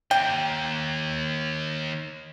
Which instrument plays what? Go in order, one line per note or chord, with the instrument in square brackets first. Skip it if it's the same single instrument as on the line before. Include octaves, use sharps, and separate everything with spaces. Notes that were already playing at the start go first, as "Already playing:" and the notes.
[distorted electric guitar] D#2 [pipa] G5